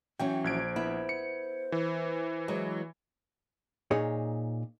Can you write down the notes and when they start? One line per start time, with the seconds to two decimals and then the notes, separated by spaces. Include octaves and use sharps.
0.19 E3 F#3 C#4 G5
0.44 A#1 C5 G#6 D7
0.76 B3 E4
1.09 C#7
1.72 E3
2.48 F#3 G#3
3.91 A#2 D#4 G#4 C#5